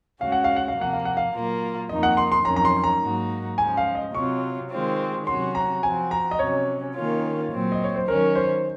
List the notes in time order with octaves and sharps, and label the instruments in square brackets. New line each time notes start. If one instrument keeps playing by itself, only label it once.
[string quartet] C#3 G#3 C#4 F#4 [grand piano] F5
[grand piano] F#5
F5
F#5
F5
[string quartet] C3 F3 A#3 [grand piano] F#5
[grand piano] F5
F#5
F5
[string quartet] A#2 F#3 A#3 F4
[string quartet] F2 D#3 A#3 D#4 [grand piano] D#5
[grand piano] F#5
C6
C6
[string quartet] F2 D#3 F#3 C#4 [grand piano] A#5
[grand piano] A#5
C6
A#5
[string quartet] G#2 F#3 A#3 D#4 F#4
[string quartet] C#3 F3 G#3 [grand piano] G#5
[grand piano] F5
D#5
[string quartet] C3 F#3 C4 F4 [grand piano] C#6
[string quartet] D#3 G#3 C4 F4
[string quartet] C3 F#3 C#4 F#4 [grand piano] C6
[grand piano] A#5
[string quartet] F3 C4 F#4 [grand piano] G#5
[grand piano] A#5
D#5
[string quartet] C3 F#3 C#4 [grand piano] C#5
[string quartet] D#3 A#3 C#4 F4
A#2 F#3 C4
[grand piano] D#5
C#5
C5
[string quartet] D#3 F#3 C#4 [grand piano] A#4
[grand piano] C5